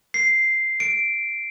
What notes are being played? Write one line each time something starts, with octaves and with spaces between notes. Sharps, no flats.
C7
D7